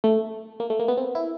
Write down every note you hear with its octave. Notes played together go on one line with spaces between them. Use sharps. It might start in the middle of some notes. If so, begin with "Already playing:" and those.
A3
A#3
A3
A#3
B3
C4
E4